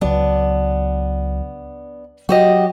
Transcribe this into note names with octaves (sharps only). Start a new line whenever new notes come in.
C#2 F#3 B3 D4
F#3 F#4 G4 D#5